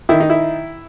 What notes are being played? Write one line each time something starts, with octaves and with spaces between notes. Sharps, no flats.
D#3 E4
D#4
E4